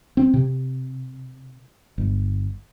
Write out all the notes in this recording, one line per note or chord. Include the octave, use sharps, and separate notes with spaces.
C4
C3
G1